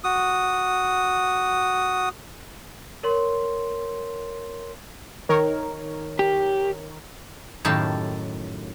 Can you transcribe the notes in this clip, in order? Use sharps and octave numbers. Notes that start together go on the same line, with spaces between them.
F#4 D#6
A#4 C#5 C6
D#3 A#4 C#5
G4
F#2 A2 D#3 G4 F5 A5